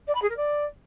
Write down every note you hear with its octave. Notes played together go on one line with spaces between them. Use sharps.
D5
B5
G#4
A#4
D5